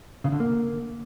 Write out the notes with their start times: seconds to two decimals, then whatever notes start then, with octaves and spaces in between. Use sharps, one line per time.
0.24 C#3
0.32 D3
0.40 A#3